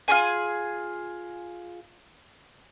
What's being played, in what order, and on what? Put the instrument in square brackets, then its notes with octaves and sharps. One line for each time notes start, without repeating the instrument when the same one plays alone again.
[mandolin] F4 G4 G#4 G#5